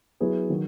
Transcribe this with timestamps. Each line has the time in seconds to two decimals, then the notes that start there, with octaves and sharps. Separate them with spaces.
0.20 F#3 B3 E4 G#4 B4
0.49 D#3 F#3